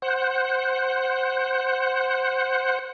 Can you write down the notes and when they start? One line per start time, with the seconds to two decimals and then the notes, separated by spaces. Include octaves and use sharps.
0.02 C5 F#5